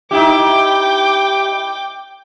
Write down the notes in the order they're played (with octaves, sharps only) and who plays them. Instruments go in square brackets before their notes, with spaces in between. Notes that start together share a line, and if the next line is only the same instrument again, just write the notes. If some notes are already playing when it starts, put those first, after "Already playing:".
[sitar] D#4 E4 G4 [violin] G5 D6